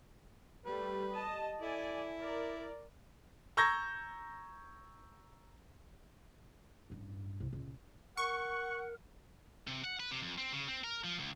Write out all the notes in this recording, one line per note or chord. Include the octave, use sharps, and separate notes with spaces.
G3 A3 B4
D#5 A5
E4 A4 D5 G#5
A#4 D5
A#5 C#6 E6 G6 G#6 A#6
A1 G2
C2
C#2 A#2
A#4 F#5 C#6
C3
F#5
B4
C3
F2
C4
C#3
C4
A#4
F3
C#2